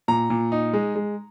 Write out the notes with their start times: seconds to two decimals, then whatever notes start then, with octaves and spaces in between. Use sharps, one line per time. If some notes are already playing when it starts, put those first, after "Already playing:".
0.08 A#2 A#5
0.30 A#2
0.52 D#4
0.73 G#3
0.96 G#3